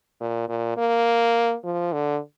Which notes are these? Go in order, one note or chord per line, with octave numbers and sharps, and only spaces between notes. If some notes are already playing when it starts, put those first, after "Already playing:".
A#2
A#2
A#3
F3
D3